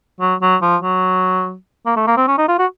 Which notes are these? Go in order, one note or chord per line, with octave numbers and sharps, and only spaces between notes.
F#3
F#3
F3
F#3
A#3
A3
A#3
C4
C#4
D#4
F4
F#4